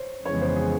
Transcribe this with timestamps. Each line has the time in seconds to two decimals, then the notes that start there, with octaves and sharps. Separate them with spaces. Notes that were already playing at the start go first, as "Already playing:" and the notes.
Already playing: C5 C#5
0.25 F2 C#3 E3 G#3 B3 C#5
0.41 C5
0.56 G#4